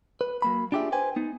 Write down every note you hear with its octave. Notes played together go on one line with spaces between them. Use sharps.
B4
F#3 A#3 B5
D4 F4 G4 G#4 E5
B4 C5 G5 G#5
B3 D#4